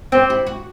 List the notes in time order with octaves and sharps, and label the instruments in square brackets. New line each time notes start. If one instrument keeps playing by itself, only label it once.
[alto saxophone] C4 [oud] G4
[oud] E4
F#4